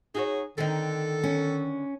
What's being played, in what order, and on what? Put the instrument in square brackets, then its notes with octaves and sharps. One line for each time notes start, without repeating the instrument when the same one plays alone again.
[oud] D#4 F#4 C#5 [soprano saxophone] G#4
[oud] D3 C4 D#4 [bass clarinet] D#3 [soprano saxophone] A4
[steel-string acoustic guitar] C#4